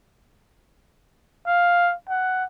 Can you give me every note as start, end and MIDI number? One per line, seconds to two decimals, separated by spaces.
1.47 1.94 77
2.09 2.45 78